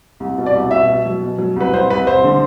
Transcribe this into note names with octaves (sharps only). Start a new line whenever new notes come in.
C2
B2
D5
C2
B2 E5
B2
F#3
B2
F#3
C2 B4
C2 C5
C2 B4
C2 C5
D3